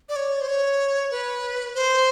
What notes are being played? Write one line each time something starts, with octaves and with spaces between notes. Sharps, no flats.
D5
C#5
C5
C#5
B4
C5